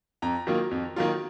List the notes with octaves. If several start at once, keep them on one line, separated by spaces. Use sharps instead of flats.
F2 A#5
D#3 F#3 A#3 F4
F2
D#3 F#3 A#3 F4